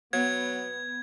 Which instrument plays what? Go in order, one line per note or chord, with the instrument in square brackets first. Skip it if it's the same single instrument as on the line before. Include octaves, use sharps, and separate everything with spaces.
[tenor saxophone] F#3 [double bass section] B3 [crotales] G#6